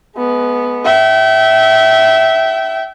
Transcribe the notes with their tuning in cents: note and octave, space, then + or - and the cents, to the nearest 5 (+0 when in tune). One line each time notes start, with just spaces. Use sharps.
G#3 +40 B3 +0
E5 -5 G5 -35